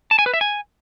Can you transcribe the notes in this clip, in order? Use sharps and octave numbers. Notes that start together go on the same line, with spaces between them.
A5
G#5
B4
E5
G#5